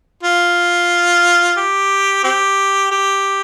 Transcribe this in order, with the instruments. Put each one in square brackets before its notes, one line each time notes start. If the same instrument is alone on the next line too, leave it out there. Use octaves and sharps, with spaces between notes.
[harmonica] F4
G4
C4 G4
G4